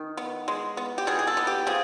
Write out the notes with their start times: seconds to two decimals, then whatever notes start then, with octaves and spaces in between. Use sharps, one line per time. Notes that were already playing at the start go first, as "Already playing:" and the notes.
Already playing: D#3
0.17 B3
0.48 G#3
0.77 B3
0.98 G4
1.07 B2 G#4
1.19 G#4
1.27 A4
1.37 B3
1.47 G4
1.67 F3 G#4